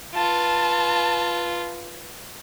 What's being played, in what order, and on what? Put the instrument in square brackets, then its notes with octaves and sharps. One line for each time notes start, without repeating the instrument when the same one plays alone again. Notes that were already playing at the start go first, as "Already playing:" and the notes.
[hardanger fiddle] F4 B4 [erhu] A5